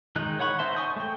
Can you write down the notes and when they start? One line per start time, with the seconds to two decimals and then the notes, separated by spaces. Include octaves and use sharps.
0.16 D#3 G#3 D#4 F#6
0.39 C#5 F#5 B5 C#6
0.59 D#4 C5 E5 A5 C6
0.75 G#5 C#6 D#6 G6
0.96 A3 G5